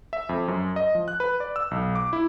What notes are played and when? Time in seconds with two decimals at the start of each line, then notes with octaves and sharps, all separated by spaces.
0.13 E5
0.29 F2
0.48 F#2
0.76 D#5
0.95 F3
1.08 F#6
1.20 B4
1.40 D5
1.56 E6
1.71 B1
1.95 D6
2.13 E4